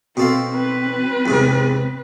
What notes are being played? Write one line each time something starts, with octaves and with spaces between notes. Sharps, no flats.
B2 C4 A4 F5
C4 B4
E2 G#2 C3